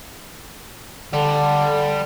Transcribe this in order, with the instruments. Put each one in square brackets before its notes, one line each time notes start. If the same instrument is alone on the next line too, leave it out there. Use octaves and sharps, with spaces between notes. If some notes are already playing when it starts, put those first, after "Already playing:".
[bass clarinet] D3 [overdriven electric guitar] G3